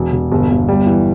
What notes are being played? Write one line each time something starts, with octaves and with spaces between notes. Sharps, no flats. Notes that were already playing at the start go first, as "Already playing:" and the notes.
Already playing: E1
E1
G1
G1
G3
E3